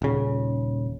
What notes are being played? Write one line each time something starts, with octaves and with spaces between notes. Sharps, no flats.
D#1 C#3